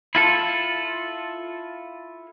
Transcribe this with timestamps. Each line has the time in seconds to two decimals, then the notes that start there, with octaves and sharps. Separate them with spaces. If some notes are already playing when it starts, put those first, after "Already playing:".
0.15 E4 F4 A4